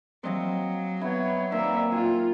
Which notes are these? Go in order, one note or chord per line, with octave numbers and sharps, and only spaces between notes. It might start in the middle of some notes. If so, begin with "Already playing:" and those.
F#3 C4 D#5 F5
B3 E4 C#5
D#3 A#3 C4 D5 E5
F4 G#5